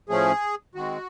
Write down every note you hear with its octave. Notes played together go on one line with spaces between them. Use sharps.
A2 F3 A3 C#4 G#4
D#3 G#3 C4 F#4